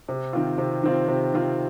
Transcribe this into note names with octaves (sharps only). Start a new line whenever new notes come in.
C3
D#3 C4 F4
C3
D#3 C4 F4
C3
D#3 C4 F4